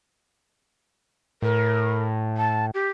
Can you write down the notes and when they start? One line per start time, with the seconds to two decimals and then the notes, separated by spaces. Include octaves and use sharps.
1.42 A2 A#4
2.37 A5
2.74 G4